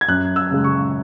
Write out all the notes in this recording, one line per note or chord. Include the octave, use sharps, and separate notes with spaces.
G#6
F#2 F#6
E6
C#3 G#3
C#6